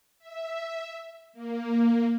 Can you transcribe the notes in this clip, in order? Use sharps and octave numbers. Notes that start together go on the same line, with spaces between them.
E5
A#3